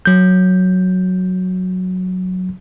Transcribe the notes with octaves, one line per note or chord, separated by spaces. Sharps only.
F#3 G6